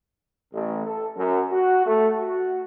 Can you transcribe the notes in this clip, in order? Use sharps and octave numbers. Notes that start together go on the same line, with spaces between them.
A1
A4
F#2
F#4
A3
F#4